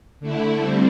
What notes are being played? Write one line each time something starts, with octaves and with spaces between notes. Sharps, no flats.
D3 A3 E4
G3 C4